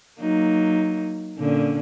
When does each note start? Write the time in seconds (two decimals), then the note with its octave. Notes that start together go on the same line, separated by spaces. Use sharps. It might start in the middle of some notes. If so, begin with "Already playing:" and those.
0.20 F#3 A#3 D#4
1.37 A#2 D3 C#4